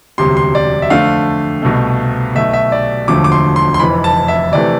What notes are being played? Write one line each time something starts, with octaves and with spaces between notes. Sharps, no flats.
E1 D2 C3 G3 C6
C6
D5
E5
F2 D3 A3 F5
C2 B2 A3
B1 B2 A3 E5
E5
D5
E1 D2 D3 F3 A3 D6
D6
C6
C6
C6
F1 F2 E3 B5
A5
E5
F2 C3 E3 A3 D5